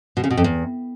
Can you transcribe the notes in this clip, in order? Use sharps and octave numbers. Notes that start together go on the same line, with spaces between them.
B2
C#3
B2
F2
E2